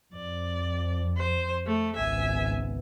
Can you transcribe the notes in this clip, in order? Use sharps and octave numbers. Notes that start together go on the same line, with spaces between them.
F2 D5
C5
A3
G#1 C#2 B3 E5 G#5